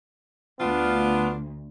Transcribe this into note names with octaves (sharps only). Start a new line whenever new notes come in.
D2 B3 D4 F4